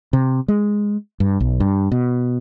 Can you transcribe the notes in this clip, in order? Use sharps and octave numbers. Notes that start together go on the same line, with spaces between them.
C3
G#3
G2
B1
G2
B2